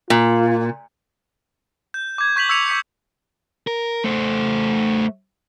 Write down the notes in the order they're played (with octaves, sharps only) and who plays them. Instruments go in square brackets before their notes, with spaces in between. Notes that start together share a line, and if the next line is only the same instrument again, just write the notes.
[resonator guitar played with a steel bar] A#2 [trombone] F4
[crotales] G6
D6 G#6
C#6 G6 B6 F7 F#7
C#6 E6 G#6 B6 C#7 F7
D6 B6 C#7
[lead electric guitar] A#4
A3 C5